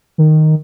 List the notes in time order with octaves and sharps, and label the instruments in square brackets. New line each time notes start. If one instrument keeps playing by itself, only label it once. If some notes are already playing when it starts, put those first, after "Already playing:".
[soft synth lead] D#3